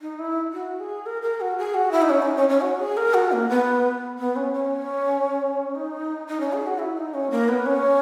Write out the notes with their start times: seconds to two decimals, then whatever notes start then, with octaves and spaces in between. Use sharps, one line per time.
0.02 D#4
0.19 E4
0.53 F#4
0.80 G#4
1.06 A#4
1.22 A#4
1.41 F#4
1.58 G#4
1.74 F#4
1.92 E4
2.02 D#4
2.10 C#4
2.22 D#4
2.36 C#4
2.49 C#4
2.61 F#4
2.79 G#4
2.97 A#4
3.14 F#4
3.32 A#3
3.49 B3
4.19 B3
4.36 C#4
4.53 C#4
5.75 D#4
6.27 D#4
6.40 C#4
6.53 G#4
6.67 F#4
6.78 E4
6.97 D#4
7.14 C#4
7.31 A#3
7.49 B3
7.66 C#4